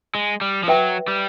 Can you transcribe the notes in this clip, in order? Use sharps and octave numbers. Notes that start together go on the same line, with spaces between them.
G#3
G3
F3
F#3 B4 E5 G5
G3